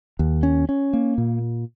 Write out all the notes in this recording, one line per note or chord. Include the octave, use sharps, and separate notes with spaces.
D#2
C#4
C#4
A#3
A#2